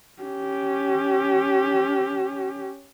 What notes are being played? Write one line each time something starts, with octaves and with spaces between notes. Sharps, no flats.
C#4 G4